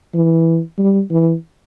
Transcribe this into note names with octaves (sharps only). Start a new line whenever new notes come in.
E3
G3
E3